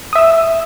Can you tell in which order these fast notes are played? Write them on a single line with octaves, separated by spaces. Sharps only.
D#6 E5 E6